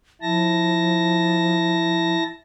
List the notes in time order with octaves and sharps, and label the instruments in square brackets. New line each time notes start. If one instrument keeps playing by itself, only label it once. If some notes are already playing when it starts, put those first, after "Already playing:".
[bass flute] F3 [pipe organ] E4 A5 A#6